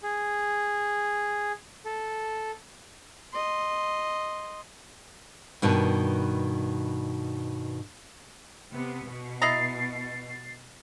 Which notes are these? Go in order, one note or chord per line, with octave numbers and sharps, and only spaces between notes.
G#4
A4
D#5 C6
G2 B2 D#3
C3 B3
B2
E4 D#5 A#5 A6 C7